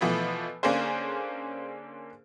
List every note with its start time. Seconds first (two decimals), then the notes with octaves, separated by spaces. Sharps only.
0.01 B2 E3 F3 A3 B3
0.63 D3 A#3 C#4 D4 G#4 C5